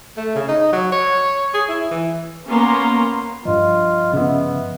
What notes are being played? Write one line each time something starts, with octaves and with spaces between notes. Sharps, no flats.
A3
C#3
D#4
F#3
C#5
G#4
E4
E3
A#3 B3 C#4 A#5 C6
G2 F3 F4 D#5
C#3 B3 E5